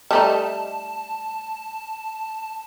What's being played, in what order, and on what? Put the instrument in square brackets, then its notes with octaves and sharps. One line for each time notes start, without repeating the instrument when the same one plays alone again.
[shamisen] G3 A3 D#4 [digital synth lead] A5